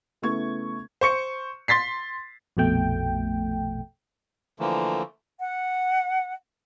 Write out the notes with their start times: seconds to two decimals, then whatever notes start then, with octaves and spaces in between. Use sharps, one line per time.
0.22 C#3 A3 B3 E4 C#6 G#6
1.01 C5 C#6 C#7
1.68 C6 A6 B6 C7
2.57 A#1 F2 B2 A3 G5
4.60 D3 E3 F3 A3 A#3
5.40 F#5